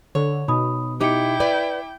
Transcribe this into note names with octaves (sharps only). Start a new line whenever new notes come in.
D3 C#5
B2 D#4 B5 D#6
D#4 E4 G4 G5 D6 C#7
B4 D5